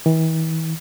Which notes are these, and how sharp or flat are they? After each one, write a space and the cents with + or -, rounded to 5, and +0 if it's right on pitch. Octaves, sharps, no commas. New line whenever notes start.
E3 -40